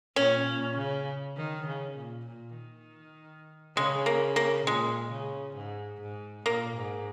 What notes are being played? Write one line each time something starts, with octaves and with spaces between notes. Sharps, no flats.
A#2 C#4
A#2
C#3
D#3
C#3
A#2
A#2
D#3
C#3 G#3
A#3
A#3
A#2 G#3
C#3
G#2
G#2
A#2 A#3
G#2